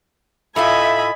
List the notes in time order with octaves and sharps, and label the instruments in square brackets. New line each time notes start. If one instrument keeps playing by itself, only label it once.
[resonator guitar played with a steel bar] A2 A3 F4 [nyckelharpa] D#5 G#5 [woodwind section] E5 [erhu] B5